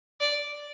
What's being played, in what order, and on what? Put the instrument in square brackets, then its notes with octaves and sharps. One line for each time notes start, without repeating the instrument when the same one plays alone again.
[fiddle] D5